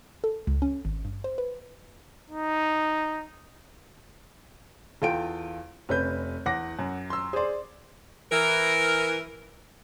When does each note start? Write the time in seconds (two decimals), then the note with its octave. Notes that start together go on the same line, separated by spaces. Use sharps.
0.24 A4
0.47 C#2
0.62 C#4
0.85 G#1
1.05 G2
1.24 C5
1.38 B4
2.30 D#4
5.02 E2 F4 A4 G5 D7
5.89 F1 C#4 B4 G6
6.46 E2 F#5 D6 A#6
6.79 F#2
7.10 C6 E6
7.33 G#4 C5 D5 C6
8.32 E3 A#4